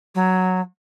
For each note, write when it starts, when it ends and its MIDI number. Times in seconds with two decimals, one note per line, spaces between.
0.15 0.60 54